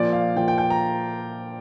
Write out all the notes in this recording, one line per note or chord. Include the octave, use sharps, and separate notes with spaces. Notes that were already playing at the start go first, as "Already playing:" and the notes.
Already playing: A#2 F3 D5
F5
A#2 F3 G5
G5
G5
A#5